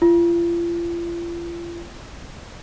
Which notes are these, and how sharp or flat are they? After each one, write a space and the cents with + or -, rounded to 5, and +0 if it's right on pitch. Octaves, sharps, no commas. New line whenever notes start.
F4 -40